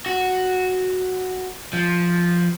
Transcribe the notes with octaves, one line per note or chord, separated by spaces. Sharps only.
F#4
F3